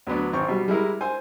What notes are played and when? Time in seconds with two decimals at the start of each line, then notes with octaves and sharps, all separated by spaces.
0.07 D2 F#3 B3 D4
0.33 G#1 C4 C#6
0.48 B2 G3
0.68 G3 G#3 E4 A#4
1.01 C5 G#5